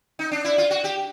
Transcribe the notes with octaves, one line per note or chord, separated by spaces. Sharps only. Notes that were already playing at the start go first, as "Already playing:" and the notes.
D#4
D4
E4
F4
F#4
G4